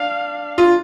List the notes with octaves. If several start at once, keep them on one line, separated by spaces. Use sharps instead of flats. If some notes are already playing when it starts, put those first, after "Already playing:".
Already playing: D4 F5
F4